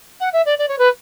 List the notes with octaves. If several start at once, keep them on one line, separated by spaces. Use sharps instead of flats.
F#5
E5
D5
D5
C#5
B4